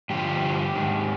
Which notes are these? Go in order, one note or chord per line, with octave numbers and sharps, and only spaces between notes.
G2 D3 F3 G4
G#2 D#3